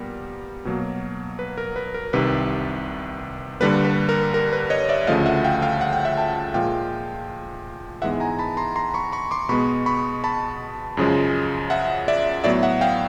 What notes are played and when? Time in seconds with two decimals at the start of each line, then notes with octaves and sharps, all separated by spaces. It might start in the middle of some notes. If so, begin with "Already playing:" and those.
Already playing: A#2 G3 B3 A#4
0.65 B2 F#3 A#3
1.39 B4
1.58 A#4
1.76 B4
1.94 A#4
2.13 C2 C3 D#3 B4
3.60 G2 D3 G3 A#3 B4
3.84 B4
4.09 A#4
4.34 A#4
4.53 B4
4.70 C#5 D#5
4.89 D5 E5
5.07 D2 C#3 F3 A3 D#5 F5
5.26 E5 F#5
5.44 F5 G5
5.62 F5 G5
5.81 F#5
5.93 G5
6.05 E5 F#5
6.17 G5 A5
6.54 A#2 F3 G#3 F5 G5
8.02 G#2 E3 G#3 B3 E5 F#5
8.20 G#5 A#5
8.39 A5 B5
8.57 A#5 C6
8.76 A#5 C6
8.94 B5 C#6
9.12 B5 C#6
9.31 C6 D6
9.49 B2 G#3 B3 B5 C#6
9.86 B5 C#6
10.24 A5 B5
10.97 F#2 C#3 F3 G#3
11.70 E5 F#5
12.08 D5 E5
12.44 A2 F#3 B3 D5 E5
12.63 E5 F#5
12.81 F5 G5